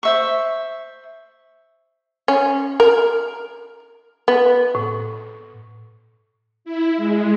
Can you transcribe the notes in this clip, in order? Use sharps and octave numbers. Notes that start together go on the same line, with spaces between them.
C5 E5 C#6
C#4
A#4
B3
A2
E4
G#3